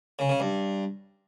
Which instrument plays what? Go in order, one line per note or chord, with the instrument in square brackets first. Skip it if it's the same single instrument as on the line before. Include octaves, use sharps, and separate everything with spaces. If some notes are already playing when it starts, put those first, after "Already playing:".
[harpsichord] C#3
C#3
G2